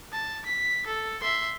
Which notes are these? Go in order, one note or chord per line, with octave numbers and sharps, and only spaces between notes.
A5
B6
A4
E5 C6